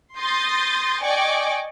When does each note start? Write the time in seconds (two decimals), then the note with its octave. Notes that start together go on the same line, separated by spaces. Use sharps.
0.18 C6 D#6 G6 A6 A#6
1.03 D5 D#5 G5 G#5 C#6 D6